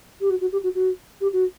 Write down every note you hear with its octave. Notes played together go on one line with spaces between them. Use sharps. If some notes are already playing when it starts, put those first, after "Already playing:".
G4
F#4
F#4
G4
F#4
F#4
G4
F#4